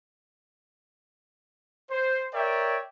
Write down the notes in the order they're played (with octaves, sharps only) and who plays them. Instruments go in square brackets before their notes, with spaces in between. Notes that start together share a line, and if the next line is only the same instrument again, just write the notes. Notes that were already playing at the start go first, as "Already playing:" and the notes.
[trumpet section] C5
A#4 C#5 D5 E5 G5